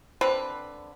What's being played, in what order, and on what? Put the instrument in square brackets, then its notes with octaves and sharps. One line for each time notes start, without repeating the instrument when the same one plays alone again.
[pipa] D3 C4 B4